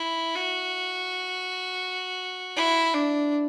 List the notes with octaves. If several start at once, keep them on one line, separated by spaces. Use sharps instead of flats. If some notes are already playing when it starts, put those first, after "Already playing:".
Already playing: E4
F#4
E4
D4